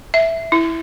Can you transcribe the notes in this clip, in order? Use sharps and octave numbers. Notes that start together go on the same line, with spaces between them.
E5
E4